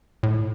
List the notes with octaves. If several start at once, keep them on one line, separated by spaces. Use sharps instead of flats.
A2